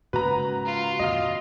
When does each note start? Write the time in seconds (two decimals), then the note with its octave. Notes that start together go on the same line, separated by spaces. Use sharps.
0.13 G#2 C#3 A#3 F#4 B4 A#5
0.65 F4
0.99 F2 A#2 D#3 D#5 F5